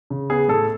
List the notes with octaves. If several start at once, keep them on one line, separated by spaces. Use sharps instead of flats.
C#3
B3 G#4
A2 A4